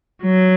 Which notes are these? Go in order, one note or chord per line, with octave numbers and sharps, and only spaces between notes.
F#3